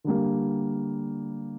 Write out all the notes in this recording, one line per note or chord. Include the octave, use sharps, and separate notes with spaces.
D3 G3 A#3